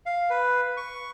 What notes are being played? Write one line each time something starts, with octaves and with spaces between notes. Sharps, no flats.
F5
B4
C#6